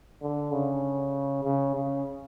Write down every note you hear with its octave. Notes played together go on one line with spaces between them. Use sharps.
D3
C#3
C#3
C#3